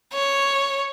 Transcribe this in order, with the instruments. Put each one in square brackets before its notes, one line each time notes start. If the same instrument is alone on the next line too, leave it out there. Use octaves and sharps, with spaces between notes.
[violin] C#5